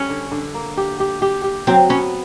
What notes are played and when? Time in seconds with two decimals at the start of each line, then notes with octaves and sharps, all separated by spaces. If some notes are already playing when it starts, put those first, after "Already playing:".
Already playing: G3 C#4
0.10 D3
0.32 D3
0.54 A#3
0.77 G4
1.00 G4
1.22 G4
1.44 G4
1.67 F#3 C4
1.89 B3 C#4